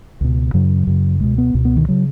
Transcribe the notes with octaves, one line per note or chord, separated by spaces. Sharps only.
C#2 B2
F#2 C#3 F#3
F#2 C#3
C#2 B2 G#3
B3
C#2 B2
B3
D#3
C#3 F#3